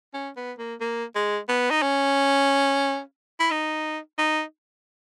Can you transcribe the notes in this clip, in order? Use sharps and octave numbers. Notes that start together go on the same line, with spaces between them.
C#4
B3
A#3
A#3
G#3
B3
D#4
C#4
E4
D#4
D#4